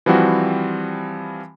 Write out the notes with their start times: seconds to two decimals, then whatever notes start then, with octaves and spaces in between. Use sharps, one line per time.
0.06 E3 F3 G3 C4 F#4